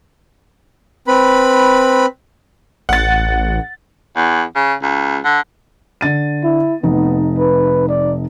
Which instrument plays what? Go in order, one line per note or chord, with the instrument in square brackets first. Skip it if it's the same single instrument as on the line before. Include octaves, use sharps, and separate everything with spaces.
[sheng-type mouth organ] C4 B4 B5
[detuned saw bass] A1 [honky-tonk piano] F#5 A6
[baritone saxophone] E2
C#3
C#2
D3
[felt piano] D3 A6 D#7
[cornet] E4
[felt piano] F1 D#4 [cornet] B3
[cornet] B4
D5